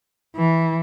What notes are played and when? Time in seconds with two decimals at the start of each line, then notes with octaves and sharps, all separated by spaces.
0.36 E3